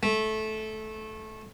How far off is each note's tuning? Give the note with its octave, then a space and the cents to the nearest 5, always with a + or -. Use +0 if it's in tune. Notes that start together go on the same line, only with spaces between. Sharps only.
A3 -15